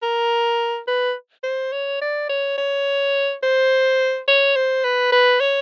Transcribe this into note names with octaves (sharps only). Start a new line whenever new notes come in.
A#4
B4
C5
C#5
D5
C#5
C#5
C5
C#5
C5
B4
B4
C#5